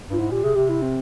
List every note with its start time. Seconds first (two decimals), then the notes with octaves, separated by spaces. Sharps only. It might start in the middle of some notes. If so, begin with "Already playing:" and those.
0.10 G2 F4
0.19 G#2 E4
0.31 A#2 G4
0.44 C3 G#4
0.56 C3 G4
0.69 E4
0.82 C4